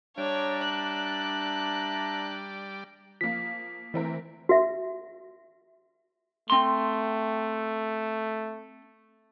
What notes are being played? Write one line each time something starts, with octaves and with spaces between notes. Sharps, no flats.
G3 D4 C#5 D5 E5 A5 A#5
F#6
F3 A#3 B6
E3 A3 C4 A#4
F#4 E5
A3 C4 C6